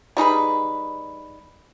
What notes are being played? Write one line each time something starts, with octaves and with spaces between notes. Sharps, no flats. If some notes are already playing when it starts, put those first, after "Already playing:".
G3 D#4 G#4 B4